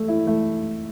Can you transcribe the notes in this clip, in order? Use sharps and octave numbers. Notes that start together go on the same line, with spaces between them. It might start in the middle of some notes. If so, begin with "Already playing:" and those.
Already playing: A3 A4
E4
A3